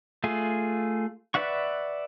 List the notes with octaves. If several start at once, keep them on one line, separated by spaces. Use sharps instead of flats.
A3 F4 G#4
B4 D5 E5 F#5 C#6